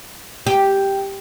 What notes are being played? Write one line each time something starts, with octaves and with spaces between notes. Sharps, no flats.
G4